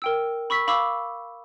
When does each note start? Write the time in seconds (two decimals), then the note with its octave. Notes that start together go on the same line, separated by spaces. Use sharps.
0.02 A#4 G5 E6
0.50 B5 C#6 E6 B6
0.67 F5 B5 C#6 D6 E6